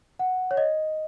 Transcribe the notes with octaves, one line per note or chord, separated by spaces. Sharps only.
F#5
C#5
D#5